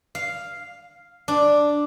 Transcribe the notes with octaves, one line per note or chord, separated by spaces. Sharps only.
F5
D4